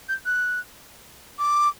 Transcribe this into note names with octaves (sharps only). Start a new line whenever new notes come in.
G6
F#6
D6